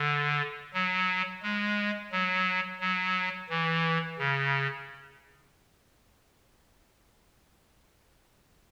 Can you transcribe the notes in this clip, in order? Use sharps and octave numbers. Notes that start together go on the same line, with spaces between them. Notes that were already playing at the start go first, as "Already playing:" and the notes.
Already playing: D3
F#3
G#3
F#3
F#3
E3
C#3